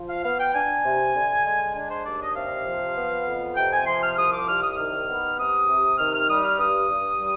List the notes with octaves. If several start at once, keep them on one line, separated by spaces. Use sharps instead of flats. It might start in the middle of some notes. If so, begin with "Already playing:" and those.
Already playing: F3
F5
B3 F5
G5
D4 G#5
C3
D3
G#3
D4 G#5
C5
D#2 D5
D#5
C3 F5
F3
B3
F2
C3 G5
G#5
F3 C6
F6
C2 D#6
D6
C2 F6
D#6
D#3 F6
B3
C3 D#6
C3
D#3 F6
F6
G3 D#6
F6
G2 D#6
G2
G3